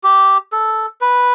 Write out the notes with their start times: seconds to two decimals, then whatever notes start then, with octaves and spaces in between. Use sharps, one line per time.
0.04 G4
0.52 A4
1.01 B4